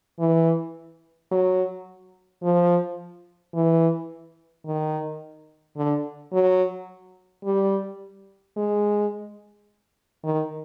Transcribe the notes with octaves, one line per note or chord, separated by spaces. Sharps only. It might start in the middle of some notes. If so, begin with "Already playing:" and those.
E3
F#3
F3
E3
D#3
D3
F#3
G3
G#3
D#3